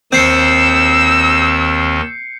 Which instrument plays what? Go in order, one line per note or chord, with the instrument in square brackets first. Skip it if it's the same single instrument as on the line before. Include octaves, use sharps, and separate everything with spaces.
[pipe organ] D#2 D#3 [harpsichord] C4 [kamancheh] E6 [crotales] G6 C7 C#7